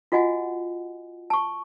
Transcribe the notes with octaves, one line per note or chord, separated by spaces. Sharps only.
F4 F#4 D#5 F#5 G#5
A5 C#6